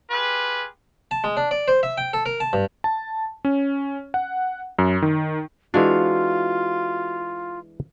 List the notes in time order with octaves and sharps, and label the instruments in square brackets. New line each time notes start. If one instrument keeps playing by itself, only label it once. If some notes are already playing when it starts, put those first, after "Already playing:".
[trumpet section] F4 G4 G#4 B4
[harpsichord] A5
G#3
D4
D5
C5
E5
G5
A4
A#4
A5
G2
[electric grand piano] A5
C#4
F#5
F#2
D#3
[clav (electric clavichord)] E3 G#3 D4 [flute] F4 [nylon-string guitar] F#4 F5